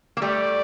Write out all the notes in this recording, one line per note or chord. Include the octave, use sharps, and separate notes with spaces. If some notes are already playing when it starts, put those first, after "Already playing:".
A#3
G3 A3 D5